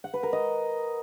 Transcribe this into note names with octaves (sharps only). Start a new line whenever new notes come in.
F#5
B4
A#4
D#5